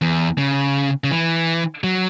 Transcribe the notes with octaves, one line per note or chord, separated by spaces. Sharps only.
E2
C#3
C#3
E3
F#3